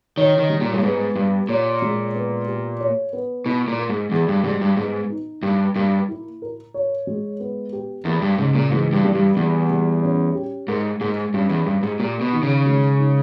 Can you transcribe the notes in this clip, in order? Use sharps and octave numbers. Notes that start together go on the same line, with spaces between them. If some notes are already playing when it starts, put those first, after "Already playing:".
D#3 C#5
D#3
G3
A#2
G2
G#2 B3
G2 G4
A#2 C#5
G#3
B3
G4
C#5
B3
B2 E4
A#2
A#4
G#2
E2 G#4
G2
G#2 G3
G2
G#2 B3
D#4
G2 A#3
G2 A#3
E4
A#4
C#5
G#3
B3
G4
E2 A#3
G2
G#2 C#3
A#2
G#2 E3
G2
G3
G2
E2 G3
G3
C#4
G4
G#2 A#4
G#2 A#3
G2 C#4
E2
G2 G4
G#2
A#2 G4
B2
D#3
C#3
G#3
D#4